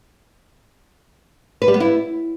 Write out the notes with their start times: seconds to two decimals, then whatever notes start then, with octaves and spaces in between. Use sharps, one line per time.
1.62 B4
1.68 G3
1.74 B3
1.80 E4